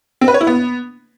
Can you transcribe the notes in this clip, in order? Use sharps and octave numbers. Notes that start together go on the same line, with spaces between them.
C4
B4
C#5
E4
B3